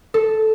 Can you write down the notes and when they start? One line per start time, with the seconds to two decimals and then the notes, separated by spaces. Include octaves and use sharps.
0.14 A4